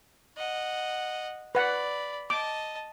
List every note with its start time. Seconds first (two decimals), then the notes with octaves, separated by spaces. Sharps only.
0.37 D#5 F#5
1.55 B4 D5 F#5 B5
2.30 D#5 A5 D6